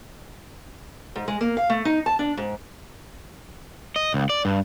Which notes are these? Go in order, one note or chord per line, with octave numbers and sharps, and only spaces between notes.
G#2
G#3
A#3
F5
A3
D#4
A5
D4
G#2
D#5
C#2
D5
G2